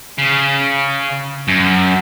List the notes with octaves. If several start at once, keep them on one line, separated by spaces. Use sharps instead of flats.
C#3
F#2